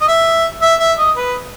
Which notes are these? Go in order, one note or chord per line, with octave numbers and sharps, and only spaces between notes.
D#5
E5
E5
E5
D#5
B4